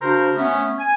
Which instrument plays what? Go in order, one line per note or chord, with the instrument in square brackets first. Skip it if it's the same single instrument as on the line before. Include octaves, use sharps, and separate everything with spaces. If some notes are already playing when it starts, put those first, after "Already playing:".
[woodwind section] C#3 D4 F#4 A#4 C5
A3 B3 C#4
G#5